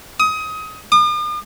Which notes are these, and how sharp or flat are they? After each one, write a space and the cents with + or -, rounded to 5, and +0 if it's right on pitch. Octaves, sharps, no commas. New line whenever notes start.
D#6 +25
D#6 -45